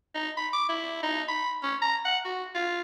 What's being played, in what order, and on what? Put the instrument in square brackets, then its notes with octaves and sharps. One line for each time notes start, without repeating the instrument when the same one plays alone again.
[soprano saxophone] D#4
B5
D6
E4
D#4
B5
C#4
A#5
F#5
F#4
F4